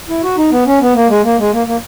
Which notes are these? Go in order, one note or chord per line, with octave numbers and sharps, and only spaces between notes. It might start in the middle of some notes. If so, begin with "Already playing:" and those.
E4
F#4
D#4
B3
C#4
B3
A#3
G#3
A#3
G#3
A#3
A#3